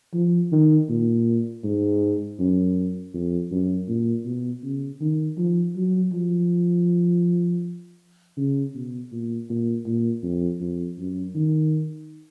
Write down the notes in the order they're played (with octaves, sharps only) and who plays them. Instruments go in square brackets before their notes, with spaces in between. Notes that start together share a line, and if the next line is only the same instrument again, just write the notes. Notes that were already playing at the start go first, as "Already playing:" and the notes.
[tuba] F3
D#3
A#2
G#2
F#2
F2
F#2
A#2
B2
C#3
D#3
F3
F#3
F3
C#3
B2
A#2
A#2
A#2
F2
F2
F#2
D#3